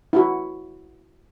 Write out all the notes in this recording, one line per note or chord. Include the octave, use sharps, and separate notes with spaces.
E4 F#4